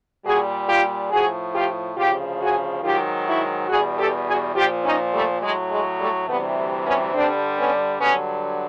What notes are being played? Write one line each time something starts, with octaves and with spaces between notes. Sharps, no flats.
A#2 G3 F#4 G#4
F4 G4
A2 F3 F#4 G#4
F4 G4
D2 C#3 F3 F4 G4
F#4 G#4
G#2 D#3 F#3 F4 G4
E4 F#4
E2 B2 G3 F#4 G#4
G4 A4
F#4 G#4
A#2 F3 F4 G4
C#4 D#4
G3 A3
A2 F#3 G#3
G#3
G3 A3
D2 C3 E3 G3 A3 B3
B3 C#4
G2 D3 G3 C4 D4
B3 C#4
G2 D3 F#3 B3 C#4